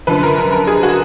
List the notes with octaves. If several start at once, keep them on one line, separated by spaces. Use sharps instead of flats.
F#2 D3 F3 B4
A#4
A#4
A#4
G#4
F#4